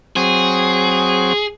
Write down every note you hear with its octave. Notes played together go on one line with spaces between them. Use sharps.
F#3 C4 G#4